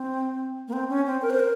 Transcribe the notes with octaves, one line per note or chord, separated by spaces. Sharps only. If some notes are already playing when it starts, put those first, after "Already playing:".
Already playing: C4
A#3
C4
C#4
C4
A#4
C5
A#4